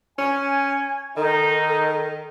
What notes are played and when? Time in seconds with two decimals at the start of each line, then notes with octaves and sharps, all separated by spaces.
0.18 C#4 G#5
1.17 D#3 D#4 A4